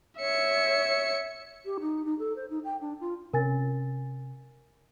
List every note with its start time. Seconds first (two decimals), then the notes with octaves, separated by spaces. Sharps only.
0.19 C#5 E5 C#7
1.65 G4
1.80 D#4
2.05 D#4
2.19 A4
2.36 C5
2.50 D#4
2.64 G5
2.81 D4
3.00 F4
3.33 C3 C#4 A#4 G#5 A6